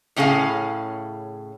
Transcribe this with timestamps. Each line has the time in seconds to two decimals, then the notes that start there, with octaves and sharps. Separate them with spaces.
0.16 A2 C#3 C#4 G#4 F5